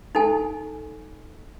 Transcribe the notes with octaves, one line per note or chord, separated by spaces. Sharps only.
D#4 A4 G#5